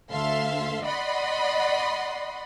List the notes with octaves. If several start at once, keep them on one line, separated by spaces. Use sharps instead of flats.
D2 A4 E5 F5 C6
D5 D#5 F#5 B5 C6